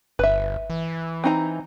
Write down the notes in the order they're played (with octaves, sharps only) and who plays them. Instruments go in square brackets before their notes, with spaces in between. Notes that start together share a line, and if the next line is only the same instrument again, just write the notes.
[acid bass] G1 [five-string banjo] B4 E5
[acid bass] E3
[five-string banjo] C4 D#4 A#5